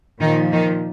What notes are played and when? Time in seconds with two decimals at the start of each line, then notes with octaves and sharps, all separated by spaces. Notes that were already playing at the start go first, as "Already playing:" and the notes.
0.20 A#2 D#3 F3 D#4
0.52 D#3 D#4